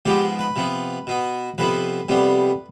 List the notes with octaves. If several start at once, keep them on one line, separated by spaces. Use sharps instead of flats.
G#2 F3 B3 G4
B4
C3 F3 B3
B2 B3
F2 C3 F3 B3 B4
F2 C3 G3 B3